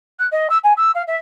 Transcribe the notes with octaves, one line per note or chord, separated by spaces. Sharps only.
F#6
D#5
E6
G#5
E6
F5
E5